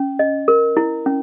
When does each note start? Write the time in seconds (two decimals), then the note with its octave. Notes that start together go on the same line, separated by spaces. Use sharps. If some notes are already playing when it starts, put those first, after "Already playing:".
Already playing: C#4
0.19 D#5
0.48 A#4
0.77 E4
1.06 C#4